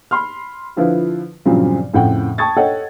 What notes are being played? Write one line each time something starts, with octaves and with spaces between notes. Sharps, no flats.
B5 C6 F6
D3 F3 E4 F4 B4
G2 A#2 C#3 F3 F#3 C4
F2 A2 C#3 F#5 G5
G5 A5 C#6 D#6 G#6 A6
A4 C#5 D#5 F#5 G5